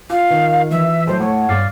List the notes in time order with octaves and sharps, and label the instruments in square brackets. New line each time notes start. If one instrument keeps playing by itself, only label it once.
[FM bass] F4 [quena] F5
[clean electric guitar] D#3 [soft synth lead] A#4
[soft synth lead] E3 [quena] E5
[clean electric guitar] A2 [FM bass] F#3 [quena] C5
[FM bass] A3 [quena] C#5 [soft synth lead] F#5
[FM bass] G2 [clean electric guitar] D5 F5